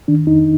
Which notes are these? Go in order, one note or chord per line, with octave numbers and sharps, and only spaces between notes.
D#3 D4
F2 D#4